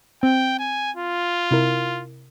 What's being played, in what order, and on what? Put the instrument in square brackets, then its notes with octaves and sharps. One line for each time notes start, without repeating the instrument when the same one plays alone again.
[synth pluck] C4 [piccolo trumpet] G5
[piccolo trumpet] G#5
F4
[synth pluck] C3 E4 A#4